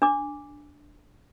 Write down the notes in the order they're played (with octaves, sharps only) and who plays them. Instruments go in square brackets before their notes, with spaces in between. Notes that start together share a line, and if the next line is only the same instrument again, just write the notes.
[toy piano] D4 D6